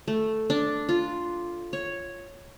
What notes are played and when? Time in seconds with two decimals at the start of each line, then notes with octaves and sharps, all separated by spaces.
0.08 A3
0.50 D4
0.89 F4
1.73 C#5